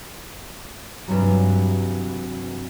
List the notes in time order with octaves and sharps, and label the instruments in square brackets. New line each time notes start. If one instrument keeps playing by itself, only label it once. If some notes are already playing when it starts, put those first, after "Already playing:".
[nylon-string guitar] G2 C3 E3 F#3